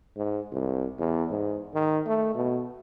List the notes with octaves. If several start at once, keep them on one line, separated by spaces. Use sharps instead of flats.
G#2
C2
E2
G#2
D#3
A3
B2